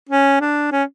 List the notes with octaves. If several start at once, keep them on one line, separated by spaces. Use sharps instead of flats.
C#4
D4
C#4